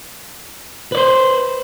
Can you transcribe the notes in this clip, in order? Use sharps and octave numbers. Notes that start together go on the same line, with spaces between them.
B4 C5 D5